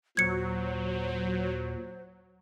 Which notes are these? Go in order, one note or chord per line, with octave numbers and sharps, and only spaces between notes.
D#2 A#2 F#3 C5 G#6 C#7